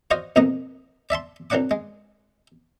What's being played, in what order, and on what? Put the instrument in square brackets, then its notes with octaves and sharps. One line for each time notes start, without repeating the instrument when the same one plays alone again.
[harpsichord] F4 F#4 C5 D5 D#5
C2 F2 B2 A#3 D#5
D5 E5 A5 C6
C2 F#3 D4 D5 F#5 D6
G#3